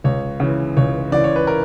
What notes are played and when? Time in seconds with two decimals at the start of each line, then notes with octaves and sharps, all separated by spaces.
0.04 C#2 C#5
0.40 C#3 E3
0.77 C#2 C#5
1.12 C#3 E3 D5
1.24 C#5
1.36 B4
1.47 A#4